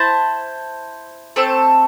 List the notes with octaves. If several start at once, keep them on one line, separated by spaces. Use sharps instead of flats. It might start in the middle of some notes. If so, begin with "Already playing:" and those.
Already playing: E4 C5 A5
A3 C4 A4